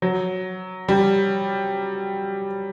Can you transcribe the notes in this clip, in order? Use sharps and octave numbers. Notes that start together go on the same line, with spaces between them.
F#3
G3